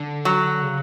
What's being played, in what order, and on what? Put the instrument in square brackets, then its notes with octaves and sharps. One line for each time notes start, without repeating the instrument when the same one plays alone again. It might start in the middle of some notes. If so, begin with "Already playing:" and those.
Already playing: [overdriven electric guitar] D3
[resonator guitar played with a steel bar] F#3
[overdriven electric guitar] C#3